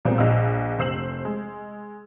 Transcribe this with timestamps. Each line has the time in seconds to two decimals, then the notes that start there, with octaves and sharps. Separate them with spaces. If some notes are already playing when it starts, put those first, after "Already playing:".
0.05 B1 A#2 G#3 B3 C4
0.18 A#1 D#5 F5 E6
0.79 F1 C5 E6 C7 E7 F#7
1.25 G#3